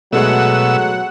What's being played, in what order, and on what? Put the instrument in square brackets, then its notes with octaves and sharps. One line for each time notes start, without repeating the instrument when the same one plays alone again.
[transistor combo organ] B2 E6 [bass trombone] F#3 [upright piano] G#3 A3 [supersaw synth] F#5